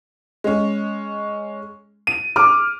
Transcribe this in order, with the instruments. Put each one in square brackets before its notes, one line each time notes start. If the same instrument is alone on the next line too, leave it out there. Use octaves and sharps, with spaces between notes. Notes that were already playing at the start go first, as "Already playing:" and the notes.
[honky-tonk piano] G#3 C#4
D#7
[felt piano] D6 [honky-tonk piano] F6